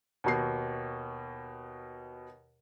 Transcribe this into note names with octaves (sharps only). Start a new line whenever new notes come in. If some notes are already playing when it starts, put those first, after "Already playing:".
D#2 B2 C7